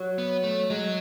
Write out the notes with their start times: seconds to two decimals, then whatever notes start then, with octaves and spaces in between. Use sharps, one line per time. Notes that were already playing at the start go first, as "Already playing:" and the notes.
Already playing: F#3
0.18 B3
0.44 A3
0.70 F#3 G#3